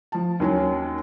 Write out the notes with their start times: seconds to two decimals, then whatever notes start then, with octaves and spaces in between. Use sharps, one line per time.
0.12 F3 A5
0.40 D#2 F#3 C#4